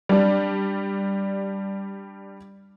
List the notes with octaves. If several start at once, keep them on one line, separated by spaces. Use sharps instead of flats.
G3 D4